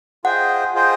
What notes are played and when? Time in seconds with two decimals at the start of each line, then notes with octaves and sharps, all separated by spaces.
0.24 F4 G#4 C5 D#5 F#5 G5
0.74 F4 G#4 C5 D#5 G5